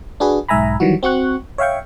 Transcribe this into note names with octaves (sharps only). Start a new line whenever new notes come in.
D4 F#4 G#4 B4
B1 G#2 E5 G#5 A#5 B5
D#3 E3 F#3 G3 F#4
C4 F#4 C#6 F#6
C#5 E5 F5 G5 C#6